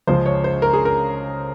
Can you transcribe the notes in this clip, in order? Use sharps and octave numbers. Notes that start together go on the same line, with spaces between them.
C#2 C#3 F3 G#3 C5
C#5
C5
A#4
G#4
A#4